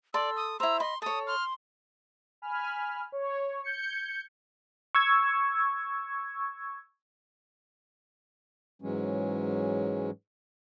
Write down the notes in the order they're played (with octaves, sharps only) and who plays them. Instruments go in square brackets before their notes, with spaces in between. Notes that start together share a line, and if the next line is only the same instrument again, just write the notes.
[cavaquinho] A4 C6 [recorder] D5 [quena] E6
[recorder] D#6
[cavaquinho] E4 C5 [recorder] A#5 [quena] E6
[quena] D#5 [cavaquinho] B5 [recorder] C6
[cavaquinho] A4 C#5 [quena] A5 [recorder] D#6
[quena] C6 [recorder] F6
[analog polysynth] G#5 B5 F6
C#5
G6 G#6 C#7
[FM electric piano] C#6 E6 G#6
[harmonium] G#2 E3 F#3 G#3 C#4